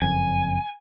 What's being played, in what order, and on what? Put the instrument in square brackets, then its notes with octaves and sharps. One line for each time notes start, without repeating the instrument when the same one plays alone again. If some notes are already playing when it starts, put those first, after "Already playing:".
[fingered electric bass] F#1 F2 [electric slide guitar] G#5